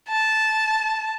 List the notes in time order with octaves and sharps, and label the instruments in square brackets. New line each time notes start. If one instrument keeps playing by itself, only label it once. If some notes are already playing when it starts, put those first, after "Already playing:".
[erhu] A5